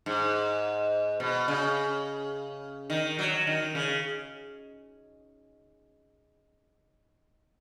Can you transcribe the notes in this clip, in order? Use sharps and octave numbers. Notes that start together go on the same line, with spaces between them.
G#2
B2
C#3
D#3
F#3
D#3
C#3